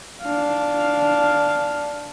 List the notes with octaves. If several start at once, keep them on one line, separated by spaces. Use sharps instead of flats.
D4 F5